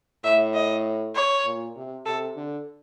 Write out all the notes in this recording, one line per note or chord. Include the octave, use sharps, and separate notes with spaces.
A2 E5
D#5
C#5
A#2
C3
C3 A4
D3